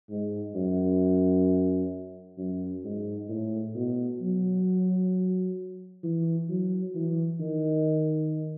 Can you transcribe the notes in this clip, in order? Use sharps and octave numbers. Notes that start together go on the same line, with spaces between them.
G#2
F#2
F#2
G#2
A2
B2
F#3
E3
F#3
E3
D#3